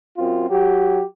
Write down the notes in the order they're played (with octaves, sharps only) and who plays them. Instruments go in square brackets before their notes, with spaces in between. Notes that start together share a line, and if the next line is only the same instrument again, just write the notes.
[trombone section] F#2 C4 F4
F#3 G4